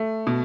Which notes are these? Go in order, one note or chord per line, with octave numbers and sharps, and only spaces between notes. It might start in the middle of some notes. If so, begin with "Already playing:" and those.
Already playing: A3
B2